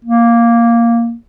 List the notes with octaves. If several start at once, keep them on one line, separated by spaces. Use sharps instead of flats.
A#3